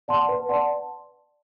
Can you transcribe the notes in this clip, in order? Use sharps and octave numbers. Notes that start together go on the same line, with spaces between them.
D5 F#5 A5 C6
B4
D5 F#5 A5 C6